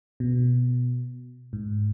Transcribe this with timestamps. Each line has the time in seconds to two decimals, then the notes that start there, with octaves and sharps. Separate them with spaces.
0.20 B2
1.53 G#2